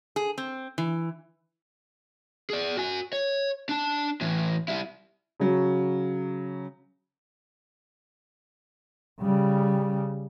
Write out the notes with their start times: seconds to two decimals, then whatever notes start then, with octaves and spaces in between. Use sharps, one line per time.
0.16 G#4
0.38 C4
0.78 E3
2.50 G#4 D5
2.77 F#4 G#5
3.13 C#5
3.69 D4 A5
4.21 A2 E3
4.68 G3 E4
5.40 C#3 F#3
9.21 C#3 G3